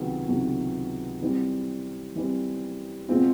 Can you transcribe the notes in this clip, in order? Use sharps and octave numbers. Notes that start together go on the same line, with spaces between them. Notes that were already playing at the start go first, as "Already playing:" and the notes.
Already playing: C#2 C3 D#3 F#3 B3
C#2 C3 D#3 F#3 B3
E3 G3 C4
E3 G3 C4
B2 G#3 C4 F4